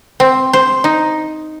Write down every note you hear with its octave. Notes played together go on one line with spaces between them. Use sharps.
C4
C5
D#4